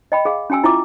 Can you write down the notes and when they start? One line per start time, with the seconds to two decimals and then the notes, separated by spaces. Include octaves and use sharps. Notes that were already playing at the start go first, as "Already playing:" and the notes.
0.12 D#5 G5 B5
0.25 G#4 F5
0.50 C#4 F#4 G5 G#5 E6
0.64 E4 F4 E5 D6